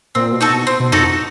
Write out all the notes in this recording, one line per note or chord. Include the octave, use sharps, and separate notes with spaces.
A#2 C4
B2
D#4 F#4 A4
B2
C4
B2
F#2 D#4 F#4 A4
F2